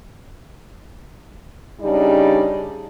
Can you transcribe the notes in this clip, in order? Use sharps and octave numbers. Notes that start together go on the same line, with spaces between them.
C#3 G3 D4 D#4 G#4 D5